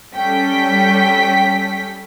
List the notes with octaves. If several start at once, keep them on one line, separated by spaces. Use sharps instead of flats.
G3 C#4 A4 G5 B6